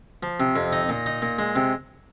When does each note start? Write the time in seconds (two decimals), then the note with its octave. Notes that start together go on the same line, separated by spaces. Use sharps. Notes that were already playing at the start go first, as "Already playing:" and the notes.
0.23 F3
0.40 C3
0.56 F2
0.72 D#4
0.89 A#2
1.06 D#4
1.22 A#2
1.38 G#3
1.56 C3